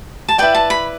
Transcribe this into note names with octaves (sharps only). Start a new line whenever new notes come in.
A5
E4 B4 D5 G5
A5
B5